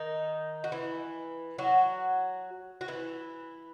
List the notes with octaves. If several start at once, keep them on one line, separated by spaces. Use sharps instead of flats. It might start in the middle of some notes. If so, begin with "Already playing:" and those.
Already playing: D#3 D#4
F#4
E3 E4
F#3 F#4
F#4
E3 E4